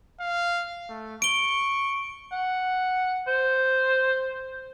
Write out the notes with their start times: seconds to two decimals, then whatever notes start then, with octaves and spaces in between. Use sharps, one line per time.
0.20 F5
0.89 A3
1.22 C#6 D7 G7
2.32 F#5
3.28 C5